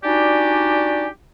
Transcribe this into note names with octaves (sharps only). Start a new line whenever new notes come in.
D4 D#4 F#4 G4 D5 G#5